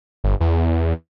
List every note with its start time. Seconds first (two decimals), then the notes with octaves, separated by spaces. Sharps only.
0.24 G1
0.40 E2